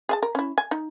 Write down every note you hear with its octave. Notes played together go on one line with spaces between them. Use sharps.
G#4 E5 A5
A#4
C#4 E4
G#5
D#4